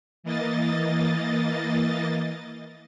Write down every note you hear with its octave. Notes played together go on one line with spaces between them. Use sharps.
E3 A#3 D#5 A6